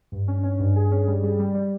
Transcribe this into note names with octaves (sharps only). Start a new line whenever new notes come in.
G2
C#4
C#4
G2
G#4
C#4
G3
G3
G3
G3